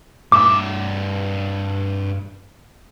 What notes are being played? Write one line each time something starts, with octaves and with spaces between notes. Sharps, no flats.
G2 E5 D6